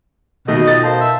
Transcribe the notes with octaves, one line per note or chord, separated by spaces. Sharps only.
B2 D#3 A3 D#5
D#4 F4 F#4 A4 A6
A#4 C5 F5 A5
E5